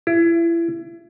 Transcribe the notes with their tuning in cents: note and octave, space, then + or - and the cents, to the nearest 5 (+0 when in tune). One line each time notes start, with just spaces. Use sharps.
E4 +30